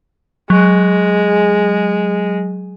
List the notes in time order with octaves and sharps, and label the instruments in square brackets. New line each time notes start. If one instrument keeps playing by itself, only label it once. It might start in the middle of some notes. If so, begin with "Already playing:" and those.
[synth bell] F#3 [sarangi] G#3